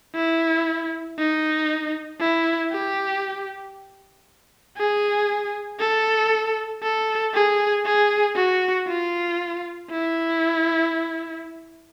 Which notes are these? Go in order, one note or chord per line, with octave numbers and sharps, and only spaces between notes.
E4
D#4
E4
G4
G#4
A4
A4
G#4
G#4
F#4
F4
E4